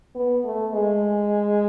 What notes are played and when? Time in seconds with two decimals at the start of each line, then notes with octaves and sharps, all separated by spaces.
0.15 B3
0.45 A3
0.74 G#3